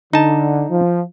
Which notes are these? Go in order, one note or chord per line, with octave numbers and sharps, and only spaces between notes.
D3 D#4 A5
F3